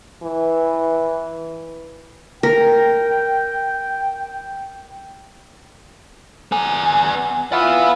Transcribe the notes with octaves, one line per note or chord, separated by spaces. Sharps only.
E3
A#4 G5
B3 G#5
E3 F4 E5 F#5 B5